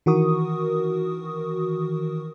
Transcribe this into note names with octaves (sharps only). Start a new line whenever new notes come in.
D#3 E3 F#4 A#4 C#6 D#6